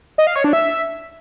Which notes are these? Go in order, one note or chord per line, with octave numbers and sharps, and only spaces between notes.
D#5
F5
C#5
D4
E5